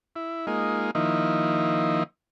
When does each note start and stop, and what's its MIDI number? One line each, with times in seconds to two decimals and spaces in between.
0.16 0.46 64
0.47 0.91 56
0.47 0.91 58
0.47 0.91 63
0.47 0.91 65
0.95 2.03 51
0.95 2.03 53
0.95 2.03 58
0.95 2.03 63
0.95 2.03 64